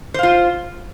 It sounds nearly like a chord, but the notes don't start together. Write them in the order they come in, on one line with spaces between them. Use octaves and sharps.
C5 F5 F4